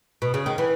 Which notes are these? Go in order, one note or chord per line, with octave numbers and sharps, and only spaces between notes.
B2
C#3
D#3
E3